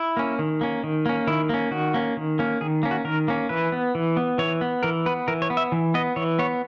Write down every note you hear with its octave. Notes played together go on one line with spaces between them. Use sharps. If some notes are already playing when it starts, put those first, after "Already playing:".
Already playing: E4
A#3 C#4
D#3
A#3 C#4
D#3
A#3 C#4
D#3 E4
A#3 C#4
D#3 F#4
A#3 C#4
D#3
A#3 C#4
D#3 G#4
A#3 C#4
F#4
D#3 A#4
A#3 C#4
E3 B4
B3
E3
B3
E3 C#5
B3
E3 A#4
B3 B4
E3 A#4
C#5
B3
E5
E3
B3 D#5
E3 C#5
B3 C#5